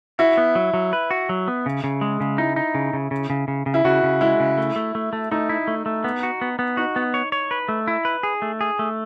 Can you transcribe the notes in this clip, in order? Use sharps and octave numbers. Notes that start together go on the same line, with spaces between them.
E4 F#4
B3
F#3
F#3
B4
F#4
F#3
B3
C#3
C#3
G#3
C#3
D#4 E4
D#4
C#3
C#3
C#3
C#3
C#3
C#3
E4
C#3 F#4
C#3
G#3 E4
C#3
A3
A3
A3
A3
A3 D#4
E4
A3
A3
B3
F#4
B3
B3
D#4 F#4
B3
C#5
C#5
B4
A3
E4
B4
G#4
A3
G#4
A3